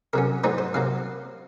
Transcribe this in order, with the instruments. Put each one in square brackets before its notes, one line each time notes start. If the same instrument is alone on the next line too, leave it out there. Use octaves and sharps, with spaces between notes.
[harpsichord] C3 F#3 C#4 A#4
G#2 F#3 A#3 D#4 C5
C5
C3 F#3 A#3 F5